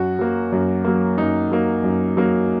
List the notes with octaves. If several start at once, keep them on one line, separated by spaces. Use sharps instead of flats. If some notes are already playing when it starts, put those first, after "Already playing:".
Already playing: F#2 F#4
F#3 A#3
F#2
F#3 A#3
F#2 D#4
F#3 A#3
F#2
F#3 A#3